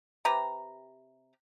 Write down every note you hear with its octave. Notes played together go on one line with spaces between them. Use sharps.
C3 G4 B4 A#5